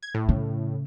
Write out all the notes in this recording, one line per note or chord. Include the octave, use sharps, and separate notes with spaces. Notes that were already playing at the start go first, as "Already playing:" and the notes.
G#6
A2
C#3